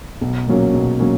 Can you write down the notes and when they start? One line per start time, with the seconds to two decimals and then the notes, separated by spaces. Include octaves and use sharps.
0.21 B1
0.47 A#2 F#3 A#3 C#4
0.74 B1
1.00 F#3 A#3 C#4